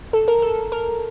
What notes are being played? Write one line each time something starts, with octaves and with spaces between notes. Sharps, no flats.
A4
A#4
A4
A#4